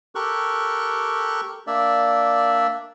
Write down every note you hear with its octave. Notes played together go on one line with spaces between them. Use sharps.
G4 A4 A#4 C#6 F#6
A#3 D4 D5 E5